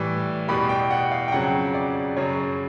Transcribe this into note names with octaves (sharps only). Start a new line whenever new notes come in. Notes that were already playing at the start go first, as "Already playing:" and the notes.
Already playing: A2 E3 G3
E2 B2 G3 B5
G5
F#5
F5
G5
F2 C#3 F#3 F#5
D5
F#2 C#3 F#3 C#5